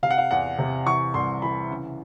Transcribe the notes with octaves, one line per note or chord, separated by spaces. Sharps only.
C3 F5
F#5
F5
E2 F#5
C3
E3 C#6
C2 C6
E3 B5
C#3